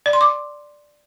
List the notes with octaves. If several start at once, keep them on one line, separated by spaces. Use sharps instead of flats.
D5
C6
D6